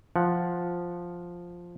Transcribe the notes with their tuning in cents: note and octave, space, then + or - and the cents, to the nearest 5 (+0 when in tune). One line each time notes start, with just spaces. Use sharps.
F3 +0 F#5 +0